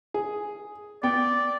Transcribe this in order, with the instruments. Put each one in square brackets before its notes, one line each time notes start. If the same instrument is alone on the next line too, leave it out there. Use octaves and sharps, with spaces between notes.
[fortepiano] G#4
[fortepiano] B3 G5 [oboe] D5